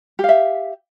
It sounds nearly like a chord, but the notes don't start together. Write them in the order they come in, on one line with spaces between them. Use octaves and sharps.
G4 F5 E5